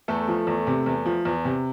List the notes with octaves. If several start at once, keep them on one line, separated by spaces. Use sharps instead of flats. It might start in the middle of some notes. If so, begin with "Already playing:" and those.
E2 A3 A4
F3
E2
C3
E2
F3
E2
C3